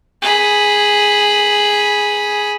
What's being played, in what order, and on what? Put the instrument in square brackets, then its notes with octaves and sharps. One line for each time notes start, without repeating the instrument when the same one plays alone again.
[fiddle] G#4 B5